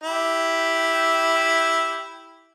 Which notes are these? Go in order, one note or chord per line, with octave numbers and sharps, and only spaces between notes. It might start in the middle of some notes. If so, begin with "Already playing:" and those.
E4 G4